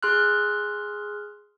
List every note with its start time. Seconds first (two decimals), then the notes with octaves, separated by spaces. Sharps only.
0.03 G#4 C6 F6 F#6